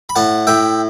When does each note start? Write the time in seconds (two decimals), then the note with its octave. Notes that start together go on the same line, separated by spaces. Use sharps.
0.09 B5
0.16 A2 F#5 A5
0.47 A2 E5 G5